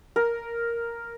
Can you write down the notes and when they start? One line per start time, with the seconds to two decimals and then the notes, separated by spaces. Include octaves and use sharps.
0.16 A#4